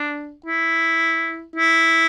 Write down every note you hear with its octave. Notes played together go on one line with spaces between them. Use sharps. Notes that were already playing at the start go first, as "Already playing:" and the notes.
Already playing: D4
E4
E4